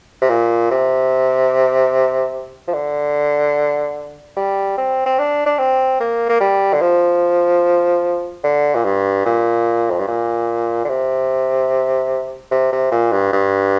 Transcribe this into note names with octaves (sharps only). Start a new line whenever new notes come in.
C3
A#2
C3
F3
D3
G3
C4
C4
D4
D4
C4
A#3
A#3
G3
D3
F3
D3
A#2
G2
A#2
F2
G2
A#2
D3
C3
C3
C3
A#2
G2
G2